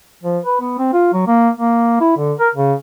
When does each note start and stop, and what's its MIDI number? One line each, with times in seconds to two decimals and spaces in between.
0.23 0.39 53
0.45 0.59 71
0.61 0.78 59
0.79 0.91 60
0.93 1.08 65
1.13 1.23 54
1.27 1.49 58
1.58 1.98 58
2.00 2.13 64
2.17 2.33 50
2.39 2.49 70
2.55 2.74 49